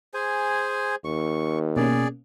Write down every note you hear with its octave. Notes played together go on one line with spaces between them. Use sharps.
G#4 C5 G#5
D#2 C#6
B2 A#3 C#4 G#4 D5